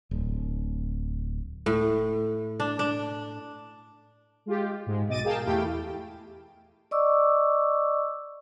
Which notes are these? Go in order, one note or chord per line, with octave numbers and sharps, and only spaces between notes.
D1
A2
D4
D4
G#3 F4 G4
G#2 G#3
B1 B2 D#5 D6 A6 D#7
G#4 A#4 F5 G5 A5
E2 A3 E4 G4 F5 G5
D5 D#5 C#6 D6 E6